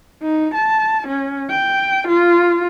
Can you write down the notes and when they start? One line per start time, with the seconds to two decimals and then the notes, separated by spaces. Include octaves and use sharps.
0.22 D#4
0.55 A5
1.07 C#4
1.50 G5
2.08 F4